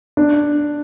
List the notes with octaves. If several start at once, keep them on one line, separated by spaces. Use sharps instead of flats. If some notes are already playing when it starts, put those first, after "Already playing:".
D4